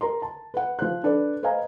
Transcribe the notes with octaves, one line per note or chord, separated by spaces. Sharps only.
A#4 A#5 C6
A5
B4 F#5
F3 C5 F#6
D4 A4 B4 D5
B4 C5 D#5 F5 G#5 A#5